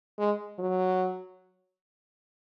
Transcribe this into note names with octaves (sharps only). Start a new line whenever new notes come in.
G#3
F#3